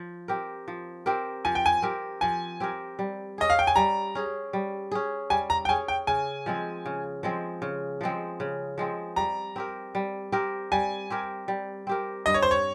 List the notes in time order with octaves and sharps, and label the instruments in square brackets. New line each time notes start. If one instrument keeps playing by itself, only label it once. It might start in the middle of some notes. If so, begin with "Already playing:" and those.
Already playing: [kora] F3
C4 G4 A#4
F3
C4 G4 A#4
[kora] F3 [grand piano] G#5
[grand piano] G5
G#5
[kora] C4 G4 A#4
[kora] F3 [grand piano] G#5
[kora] C4 G4 A#4
G3
[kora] C#4 G#4 [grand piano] D#5
[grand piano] F5
G5
G#5
[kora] G3 [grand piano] A#5
[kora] C#4 G#4
G3
C#4 G#4
[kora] G3 [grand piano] G#5
[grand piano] A#5
G5
[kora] C#4 G#4 [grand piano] G#5
[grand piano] G5
[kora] C#3 [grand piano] G#5
[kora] F3 G#3 C4
C#3
F3 G#3 C4
C#3
F3 G#3 C4
C#3
F3 G#3 C4
[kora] G3 [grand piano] A#5
[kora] C4 G4 A#4
G3
C4 G4 A#4
[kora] G3 [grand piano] G#5
[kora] C4 G4 A#4
G3
C4 G4 A#4
[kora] G2 [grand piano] D#5
[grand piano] C#5
C5
C#5